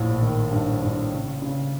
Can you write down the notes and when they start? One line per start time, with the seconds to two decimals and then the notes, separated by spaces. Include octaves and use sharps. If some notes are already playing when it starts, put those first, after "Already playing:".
Already playing: A#1 A2
0.22 D#3
0.51 G2
0.82 G2
1.12 C#3
1.42 C#3